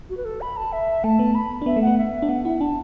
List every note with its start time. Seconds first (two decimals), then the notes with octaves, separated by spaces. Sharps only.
0.10 F#4
0.17 B4
0.25 A4
0.41 B5
0.57 A5
0.73 E5
1.04 A3 A5
1.19 B3
1.35 B5
1.62 D4
1.66 B3 E5
1.76 A3
1.82 F#5
1.87 B3
1.98 E5
2.22 D4
2.29 B3 F#5
2.45 E4 F#5
2.61 D4 A5